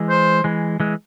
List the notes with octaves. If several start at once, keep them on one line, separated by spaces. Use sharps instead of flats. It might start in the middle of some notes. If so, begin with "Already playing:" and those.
Already playing: E3 G#3
C5
E3 G#3
E3 G#3